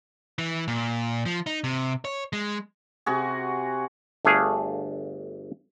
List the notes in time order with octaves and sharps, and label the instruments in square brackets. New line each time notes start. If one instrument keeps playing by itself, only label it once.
[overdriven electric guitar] E3
A#2
F3
D#4
C3
C#5
G#3
[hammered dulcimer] C3 F#4 G#4
[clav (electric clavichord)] G1 A3 D4 G#4 F5